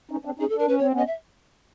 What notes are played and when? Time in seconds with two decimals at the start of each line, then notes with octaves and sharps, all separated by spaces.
0.11 C#4 D#4
0.25 C4 D4
0.39 C#4 D#4 G#4
0.49 A4
0.54 D4
0.59 A#4
0.67 C#4 B4
0.79 C4 C#5
0.92 B3 C#4
0.98 D#5
1.07 E5